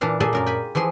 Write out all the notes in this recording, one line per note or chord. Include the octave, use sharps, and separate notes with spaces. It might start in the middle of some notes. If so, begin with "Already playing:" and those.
A#2 E3 D4 F5
A#2 G#4 A4 D5 G#5
F#2 A#4 D5
G5 G#5 B5
E3 F3 G#4 C6